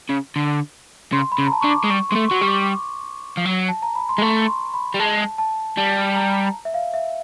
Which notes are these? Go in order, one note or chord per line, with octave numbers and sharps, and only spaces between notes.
C#3
D3
C#3 C6
B5
C#3
A#5
A5
D3 C#6
D6
G#3
G3 C#6
C6
G#3
A3
C#6
F#3
G3 C#6
D6
F3
F#3
A5
A#5
B5
C6
G#3
A3 C#6
C6
B5
G3
G#3 A5
A5
G3 A5
A#5
E5
F5
E5